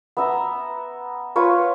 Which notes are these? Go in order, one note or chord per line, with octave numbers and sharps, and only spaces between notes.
B3 E5 A#5
F4 B4 C#5